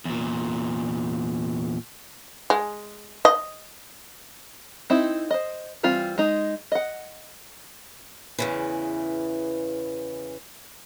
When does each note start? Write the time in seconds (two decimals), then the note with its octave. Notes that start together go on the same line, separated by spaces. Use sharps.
0.05 E2 A#2
2.50 G#3
3.25 D#5
4.90 C4 D#4 E4
5.31 C5 D#5
5.83 E3 G3 C4 F4
6.18 G#3 D#4
6.72 D#5 F#5
8.38 E2 C#3 E3